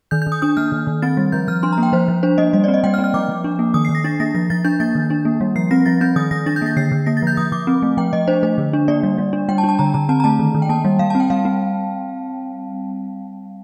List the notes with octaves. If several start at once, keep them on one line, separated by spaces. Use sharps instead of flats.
D#3 G6
G6
D#3
D#6
D4 D#6
A#3 F6
D#3
D#3
C4 A6
G3
F3 G6
F3 F6
D4 C6
A#5
A#3
G5
F3 C5
F3
D4 C5
A#3 D#5
G3 D#5
D5
C4
D#5
G3 G5
F6
C4
F6
F3 D6
F3
D4
A#3
D#3 D#6
C7
D#3
A#6
D4 A6
A#3 A#6
F3 A#6
F3 A6
D4 G6
A#3 A6
D#3
D4
A#3
G3
F3 C7
C4 A#6
F3 A6
C4 G6
D#3 D#6
D#3 A#6
D4 A6
G6
A#3 A6
D3 C7
D3
A#3 A#6
A6
F3 G6
F3 D#6
F3 D6
C4
A3
F3 G5
F3 D#5
D4 C5
A3 C5
D3
D4
A#3 D5
G3
G3
D4
G3 G5
A5
D4
A5
D3 A#5
D3 A#5
C4 A5
A#5
A3 A5
D#3
D#3
G5
A#3 A5
G3
G3 F5
A5
C4
G5
G3 F5
C4